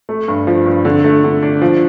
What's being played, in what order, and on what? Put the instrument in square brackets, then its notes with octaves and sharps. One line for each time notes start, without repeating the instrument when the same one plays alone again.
[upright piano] A3
G2
F3
G2
D3
A3
D3
D4
F3